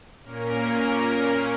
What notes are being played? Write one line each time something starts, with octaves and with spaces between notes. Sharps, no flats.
A#2 A#3 C#4 A#4
A#4